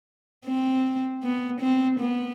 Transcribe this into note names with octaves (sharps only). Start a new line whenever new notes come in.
C4
B3
C4
B3